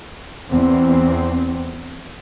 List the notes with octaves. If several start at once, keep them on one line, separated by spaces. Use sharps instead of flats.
E2 C4